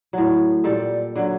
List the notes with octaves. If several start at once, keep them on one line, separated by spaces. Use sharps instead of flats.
A2 F#3
A#2 G3 A4
D3 F#3